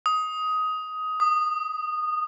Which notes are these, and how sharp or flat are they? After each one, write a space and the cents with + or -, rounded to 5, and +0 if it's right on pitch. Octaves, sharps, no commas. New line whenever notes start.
D#6 +15
D#6 -15